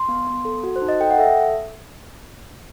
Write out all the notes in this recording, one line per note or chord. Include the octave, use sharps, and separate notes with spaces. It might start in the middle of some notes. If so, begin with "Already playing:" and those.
Already playing: C6
B3
B3
A4
F#4
C5
D#4
D#5
A4 G5
F#5
A4 E5